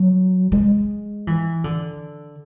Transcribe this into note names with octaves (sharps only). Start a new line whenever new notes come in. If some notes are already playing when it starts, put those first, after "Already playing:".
Already playing: F#3
G#3
E3
D3